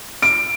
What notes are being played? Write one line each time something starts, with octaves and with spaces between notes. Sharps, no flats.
D7